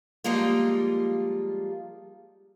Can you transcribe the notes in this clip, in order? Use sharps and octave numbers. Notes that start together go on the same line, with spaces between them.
F3 G3 G#3 A#3 F4